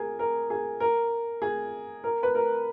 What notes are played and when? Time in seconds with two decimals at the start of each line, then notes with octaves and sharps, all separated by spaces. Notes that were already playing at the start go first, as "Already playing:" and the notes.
Already playing: G#4 A#4
0.19 A#4
0.50 G#4
0.80 A#4
1.42 G#4
2.04 A#4
2.23 B4
2.35 A#4